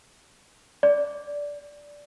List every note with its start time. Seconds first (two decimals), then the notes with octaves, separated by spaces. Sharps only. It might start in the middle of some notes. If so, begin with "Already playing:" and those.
0.83 D5